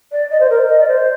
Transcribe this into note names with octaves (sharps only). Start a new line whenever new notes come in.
D5
D#5
C5
A#4
D#5
D5
C5